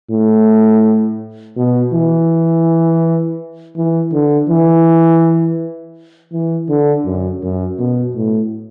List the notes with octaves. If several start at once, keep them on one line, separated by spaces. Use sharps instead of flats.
A2
B2
E3
E3
D3
E3
E3
D3
F#2
F#2
B2
A2